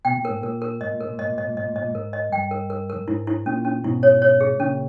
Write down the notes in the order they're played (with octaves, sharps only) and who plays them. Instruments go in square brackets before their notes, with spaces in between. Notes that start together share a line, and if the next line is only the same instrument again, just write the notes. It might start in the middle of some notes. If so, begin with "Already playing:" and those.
[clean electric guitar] B2 [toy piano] G5
[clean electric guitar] A#2
[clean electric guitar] G#2 [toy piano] A#4
[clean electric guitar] A#2 [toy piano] A#4
[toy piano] A#4
[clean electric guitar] G#2 [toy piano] D#5
[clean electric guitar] A#2
[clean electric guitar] G#2 [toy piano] A#4
[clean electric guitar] A#2
[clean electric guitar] G#2 [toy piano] D#5
[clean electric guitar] A#2
[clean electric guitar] G#2 [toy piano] D#5
[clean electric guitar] A#2
[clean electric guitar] G#2 [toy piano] D#5
[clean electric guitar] A#2
[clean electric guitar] G#2 [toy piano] D#5
[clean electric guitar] A#2
[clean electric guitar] G#2 [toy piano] A#4
[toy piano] D#5
[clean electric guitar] G2 [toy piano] G5
[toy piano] A#4
A#4
A#4
[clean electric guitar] G2
[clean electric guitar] G#2 [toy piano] E4
[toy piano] E4
[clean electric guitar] A#2 [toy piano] C#4
[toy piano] C#4
[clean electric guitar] G#2 B2 [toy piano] E4
[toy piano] C#5
C#5
G#4
[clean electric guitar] A#2 C#3 [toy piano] C#4